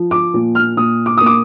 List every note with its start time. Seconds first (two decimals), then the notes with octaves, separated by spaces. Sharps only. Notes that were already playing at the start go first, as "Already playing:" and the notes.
Already playing: F3
0.11 D6
0.34 A#2
0.55 F6
0.77 A#2 D#6
1.06 D6
1.18 A#3 D#6
1.26 D6